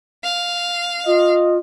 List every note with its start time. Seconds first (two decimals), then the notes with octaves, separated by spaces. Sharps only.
0.24 F5
1.06 F4 D#5